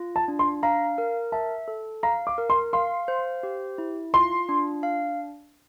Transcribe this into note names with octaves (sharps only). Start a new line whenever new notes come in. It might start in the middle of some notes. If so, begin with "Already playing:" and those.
Already playing: F4
A5
D4
C6
F5 A#5
A#4
E5 A5
A4
F5 A#5
D6
A#4
C6
F5 C6
C5
G4
E4
F4 C6
D4
F5